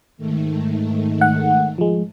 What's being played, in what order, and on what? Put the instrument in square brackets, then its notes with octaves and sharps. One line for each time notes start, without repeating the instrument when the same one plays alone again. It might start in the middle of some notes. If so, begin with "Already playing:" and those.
[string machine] G#2 D#3 A3
[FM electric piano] F#5
F3 G#3